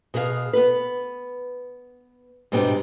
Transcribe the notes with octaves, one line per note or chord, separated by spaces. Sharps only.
B2 G#4 A#4 F5
B3 B4
G#2 B2 G3 B3 C4 D4